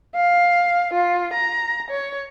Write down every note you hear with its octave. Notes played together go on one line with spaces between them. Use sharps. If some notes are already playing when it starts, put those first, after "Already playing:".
F5
F4
A#5
C#5